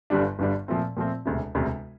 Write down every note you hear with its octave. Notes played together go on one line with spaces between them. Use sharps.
G1 G2 D3 G3 D4
G1 G2 D3 G3 D4
A#2 F3 A3 C4
A#2 F3 A3 C4
E1 D2 C3
E1 D2 C3